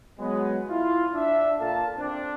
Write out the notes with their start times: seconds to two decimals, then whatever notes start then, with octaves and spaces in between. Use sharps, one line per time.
0.19 F#3 G#3 B3
0.69 E4 F4
1.14 D4 E5
1.60 A#2 A4 F5 A5
1.97 C4 D4